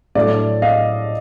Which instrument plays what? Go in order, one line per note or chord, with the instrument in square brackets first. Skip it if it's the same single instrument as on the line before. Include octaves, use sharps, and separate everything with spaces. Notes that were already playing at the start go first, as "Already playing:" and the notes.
[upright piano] A2 F#3 A3 D4 [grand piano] D5 E5
[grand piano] D#5 F5